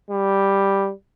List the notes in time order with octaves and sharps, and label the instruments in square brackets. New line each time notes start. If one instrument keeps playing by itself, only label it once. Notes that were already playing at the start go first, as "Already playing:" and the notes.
[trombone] G3